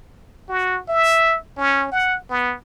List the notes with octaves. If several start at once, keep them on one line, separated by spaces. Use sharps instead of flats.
F#4
E5
C#4
F#5
B3